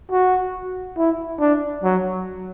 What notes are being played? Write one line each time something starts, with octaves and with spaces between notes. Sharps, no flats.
F#4
E4
D4
F#3